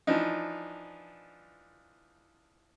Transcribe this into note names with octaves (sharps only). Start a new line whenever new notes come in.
E3 F3 D4 D#4